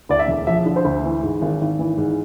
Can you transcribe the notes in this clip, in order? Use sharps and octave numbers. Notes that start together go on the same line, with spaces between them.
D2 D5
E5
E1
F3 E5
D3
C5
D2
E3
G#2
G#1
G#1
E3
G#2